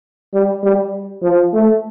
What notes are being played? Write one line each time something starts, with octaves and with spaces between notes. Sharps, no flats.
G3
G3
F3
A3